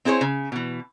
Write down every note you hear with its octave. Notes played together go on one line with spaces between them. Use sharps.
C4 E4 G#4 C5 C#5
C#3
B2 E3